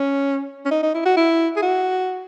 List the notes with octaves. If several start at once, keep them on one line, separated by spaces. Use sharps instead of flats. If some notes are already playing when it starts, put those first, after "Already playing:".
Already playing: C#4
C#4
D#4
D#4
E4
F#4
E4
G#4
F#4